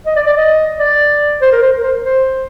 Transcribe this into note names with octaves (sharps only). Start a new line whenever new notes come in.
D#5
D5
D5
D#5
D5
C5
A#4
C5
A#4
C5
C5